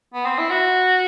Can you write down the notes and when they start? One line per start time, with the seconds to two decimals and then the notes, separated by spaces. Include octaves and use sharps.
0.14 B3
0.26 C4
0.38 E4
0.50 F#4